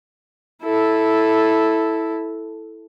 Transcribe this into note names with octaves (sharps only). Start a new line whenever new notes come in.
E4 A4